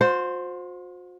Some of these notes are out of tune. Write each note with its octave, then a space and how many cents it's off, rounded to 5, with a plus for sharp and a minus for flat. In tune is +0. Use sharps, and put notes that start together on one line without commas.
F#4 -45 C5 +0